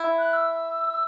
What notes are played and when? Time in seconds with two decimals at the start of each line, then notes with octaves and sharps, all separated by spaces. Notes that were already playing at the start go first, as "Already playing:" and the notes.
Already playing: E4
0.19 F#6
0.33 E6